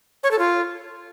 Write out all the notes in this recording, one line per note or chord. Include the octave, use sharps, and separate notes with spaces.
C#5
A4
F4